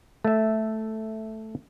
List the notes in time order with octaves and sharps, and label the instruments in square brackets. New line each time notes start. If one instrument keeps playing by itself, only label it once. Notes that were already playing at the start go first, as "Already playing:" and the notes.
[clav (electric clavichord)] A3 E5